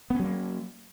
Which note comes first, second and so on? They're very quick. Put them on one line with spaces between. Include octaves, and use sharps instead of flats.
B3 C#4 F#3 A#3